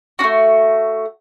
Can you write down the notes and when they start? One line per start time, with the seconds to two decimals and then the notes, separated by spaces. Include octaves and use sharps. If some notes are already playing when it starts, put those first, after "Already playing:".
0.19 D4 F#4
0.24 A3